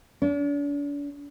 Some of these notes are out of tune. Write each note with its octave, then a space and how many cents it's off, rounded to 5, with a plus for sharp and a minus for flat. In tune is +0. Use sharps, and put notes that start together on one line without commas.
D4 -40